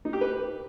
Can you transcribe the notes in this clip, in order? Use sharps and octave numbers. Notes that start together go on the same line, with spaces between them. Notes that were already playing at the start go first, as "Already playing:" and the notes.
D#4
G4
B4